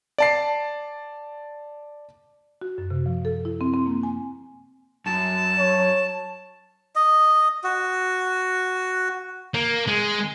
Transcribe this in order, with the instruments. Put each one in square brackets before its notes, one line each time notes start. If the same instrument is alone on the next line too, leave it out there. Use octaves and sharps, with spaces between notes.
[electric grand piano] D5 A5 C7
[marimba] F#4
F#2
C3
F3
A4
E4
C4
C4
A#3
G#5
[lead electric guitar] F#2 [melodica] A5
[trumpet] C#5
[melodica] D#5
F#4
[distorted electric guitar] A#3
G#3